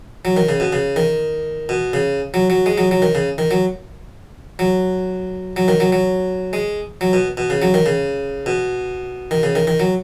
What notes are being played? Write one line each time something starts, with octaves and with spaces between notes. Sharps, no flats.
F#3
D#3
C#3
B2
C#3
D#3
B2
C#3
F#3
F#3
G#3
F#3
F#3
D#3
C#3
D#3
F#3
F#3
F#3
D#3
F#3
F#3
G#3
F#3
B2
B2
C#3
F#3
D#3
C#3
B2
D#3
C#3
D#3
D#3
F#3